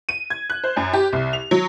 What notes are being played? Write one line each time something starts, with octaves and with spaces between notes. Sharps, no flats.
D#7
G#6
F#6
C5
F#2
G4
C2
F7
F#3